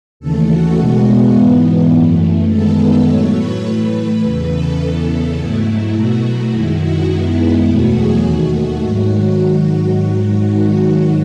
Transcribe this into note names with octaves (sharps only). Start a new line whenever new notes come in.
D#2 C#3 E3 A3 A4
F#4
B2 G#3 B3 F#4
F#4
G#2 E3 B3
F#2 E3 A3
F#2 D#3 G#3 B3 A4
A2 F#3 A3 C#5
B4
A2 E3 A3
E2 C#3 E3 B4
A4
E2 C#3 E3 B3
G#2 F#3 A3 E4
B2 F#3 A3 F#4
F#2 D#3 G#3 E4
F#4
F#2 D#3 G#3 B3 E4
E2 B2 F#3 A3 F#4
G#4
D#2 D#3 A3 F#4
F#4
G#2 D#3 F#3